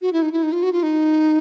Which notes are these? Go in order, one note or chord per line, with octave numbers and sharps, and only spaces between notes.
F#4
E4
D#4
E4
D#4
F4
F#4
F4
D#4